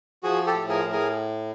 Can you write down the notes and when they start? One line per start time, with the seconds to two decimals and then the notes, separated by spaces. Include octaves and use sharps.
0.23 F3 F#4 G#4
0.46 G4 A4
0.54 A2
0.69 G#4 A#4
0.84 A2
0.92 G#4 A#4